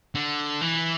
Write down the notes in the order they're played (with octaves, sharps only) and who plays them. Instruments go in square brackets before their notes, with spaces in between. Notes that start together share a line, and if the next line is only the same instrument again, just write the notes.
[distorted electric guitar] D3
E3